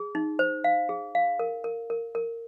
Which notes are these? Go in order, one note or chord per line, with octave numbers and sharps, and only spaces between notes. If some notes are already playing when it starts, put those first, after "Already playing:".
Already playing: G#4
D#4
C5
F5
G#4
F5
A#4
A#4
A#4
A#4